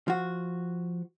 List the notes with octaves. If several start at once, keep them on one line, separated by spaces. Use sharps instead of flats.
F3 F#4